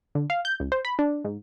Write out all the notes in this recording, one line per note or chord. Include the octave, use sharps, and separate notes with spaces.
D3
F5
G6
C#2
C5
B5
D4
G#2